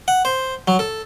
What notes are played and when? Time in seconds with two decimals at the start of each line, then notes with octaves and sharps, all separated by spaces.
0.08 F#5
0.25 C5
0.68 F#3
0.79 A4